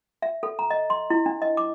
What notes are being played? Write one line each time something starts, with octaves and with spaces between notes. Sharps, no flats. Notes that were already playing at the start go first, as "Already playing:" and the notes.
E5
A4
A#5
D#5
C6
E4
D4
D#5
D6